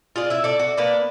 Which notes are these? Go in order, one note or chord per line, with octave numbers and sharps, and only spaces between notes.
F4 G#4 D5
E4 E5
A4 D5
F#4
A#3 B3 D4 D5